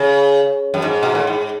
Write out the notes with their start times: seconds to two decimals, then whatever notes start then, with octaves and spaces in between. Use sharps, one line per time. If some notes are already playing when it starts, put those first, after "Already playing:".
Already playing: C#3
0.74 F#2
0.82 G#2
1.03 B2
1.15 A2
1.27 G#2